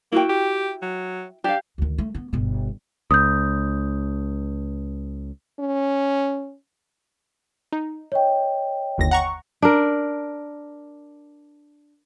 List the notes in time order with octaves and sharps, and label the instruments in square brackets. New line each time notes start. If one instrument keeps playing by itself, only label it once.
[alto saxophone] A#3 [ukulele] E4 F#4 G5
[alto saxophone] G4
F#3
[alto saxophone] D4 [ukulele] G4 F5
[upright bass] D2 D#3
A3
B3
G1 B2
[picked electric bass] C#2 [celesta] D#6 G6
[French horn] C#4
[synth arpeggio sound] D#4
[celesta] C#5 D#5 G5
[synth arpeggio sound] G1 D#2 A#6
F#5 A#5 C#6
[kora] D4 A#4